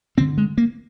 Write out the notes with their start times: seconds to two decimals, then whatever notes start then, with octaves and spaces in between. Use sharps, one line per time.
0.18 G2 D3 C4
0.38 G#3
0.58 A#3